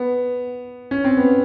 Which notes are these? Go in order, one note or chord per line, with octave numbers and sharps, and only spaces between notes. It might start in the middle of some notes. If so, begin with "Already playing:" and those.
Already playing: B3
C#4
C4
B3